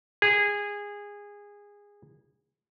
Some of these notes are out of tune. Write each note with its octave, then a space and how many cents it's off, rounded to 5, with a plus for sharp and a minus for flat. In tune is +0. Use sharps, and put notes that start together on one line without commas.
G#4 -20